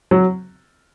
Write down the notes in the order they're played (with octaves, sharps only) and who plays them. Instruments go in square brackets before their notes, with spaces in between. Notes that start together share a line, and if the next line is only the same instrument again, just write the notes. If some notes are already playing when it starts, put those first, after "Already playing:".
[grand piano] F#3